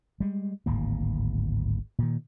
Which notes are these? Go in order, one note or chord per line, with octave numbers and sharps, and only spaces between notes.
G3 G#3
D1 G#1 G#2 A#3
A#2 D#3